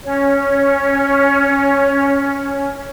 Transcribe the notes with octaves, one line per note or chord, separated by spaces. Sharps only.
C#4 C#5